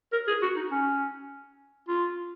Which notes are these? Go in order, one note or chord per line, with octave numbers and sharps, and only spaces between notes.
A#4
G#4
F#4
D#4
C#4
F4